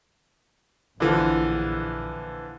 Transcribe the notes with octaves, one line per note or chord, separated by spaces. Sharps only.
A#1 D3 E3 F3